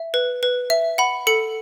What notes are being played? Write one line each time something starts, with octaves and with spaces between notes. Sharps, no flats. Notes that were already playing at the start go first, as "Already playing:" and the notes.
Already playing: E5
B4
B4
E5
F#5 B5
A4 C#7